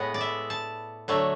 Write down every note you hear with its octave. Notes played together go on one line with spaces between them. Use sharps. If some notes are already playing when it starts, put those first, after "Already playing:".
Already playing: A2 G#3 B3 F#5
D5
E5
A5
D3 F#3 A3